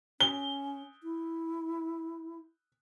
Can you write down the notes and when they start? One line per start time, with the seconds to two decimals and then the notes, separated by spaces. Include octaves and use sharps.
0.20 C#4 G7
1.03 E4